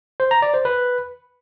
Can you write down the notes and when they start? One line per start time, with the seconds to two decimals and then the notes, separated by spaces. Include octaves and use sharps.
0.20 C5
0.31 A#5
0.42 D5
0.54 C5
0.65 B4